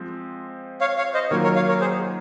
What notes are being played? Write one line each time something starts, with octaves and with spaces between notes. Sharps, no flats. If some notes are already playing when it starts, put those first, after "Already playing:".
Already playing: F3 G#3 C4
C#5 F5
C#5 F5
C5 D#5
D#3 F#3 A#3 F4 A#4 C#5
A#4 C#5
C#5 F5
A#4 C#5
G#4 C5